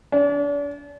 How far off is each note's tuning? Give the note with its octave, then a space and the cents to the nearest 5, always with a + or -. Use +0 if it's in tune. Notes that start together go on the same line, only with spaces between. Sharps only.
D4 -35